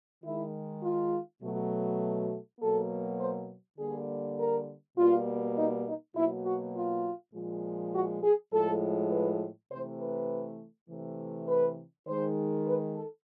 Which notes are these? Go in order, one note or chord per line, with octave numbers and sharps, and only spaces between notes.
D#3 G#3 E4
F4
B2 F#3 A3
B2 F#3 A#3 A4
C5
D3 G3 A#3 G#4
A#4
B2 G3 A#3 F4
D#4
D#4
B2 F#3 A#3 E4
F#4
F4
A#2 F3 G#3
F#4
G#4
A2 F3 G#3 A4
B4
C3 E3 A3 C5
B4
C3 E3 A3
B4
D#3 G#3 C5
B4
A4